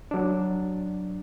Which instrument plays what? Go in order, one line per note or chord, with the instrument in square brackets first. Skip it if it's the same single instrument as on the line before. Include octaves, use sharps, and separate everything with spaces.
[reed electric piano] F#3 D4